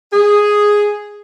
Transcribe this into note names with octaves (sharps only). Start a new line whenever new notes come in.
G#4